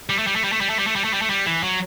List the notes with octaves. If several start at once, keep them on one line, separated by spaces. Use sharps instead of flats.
G3
A3
G3
A3
G3
A3
G3
A3
G3
A3
G3
A3
G3
A3
G3
E3
F#3